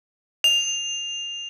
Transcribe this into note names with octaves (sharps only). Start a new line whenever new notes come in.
F7